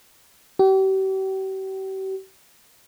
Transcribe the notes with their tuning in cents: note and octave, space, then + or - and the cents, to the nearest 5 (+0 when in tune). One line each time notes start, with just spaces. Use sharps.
G4 -40